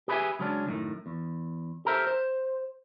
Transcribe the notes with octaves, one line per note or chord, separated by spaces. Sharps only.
G4 G#4 B4 C#5 E5 G#5
C#3 F#3 G#3 B3 C#4 D4
F#2 A2 D#3
E2
G4 A4 A#4 C5 E5
C5